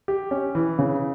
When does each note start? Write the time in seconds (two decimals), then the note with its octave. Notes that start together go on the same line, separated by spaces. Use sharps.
0.08 G4
0.31 C#4
0.55 E3
0.79 C#3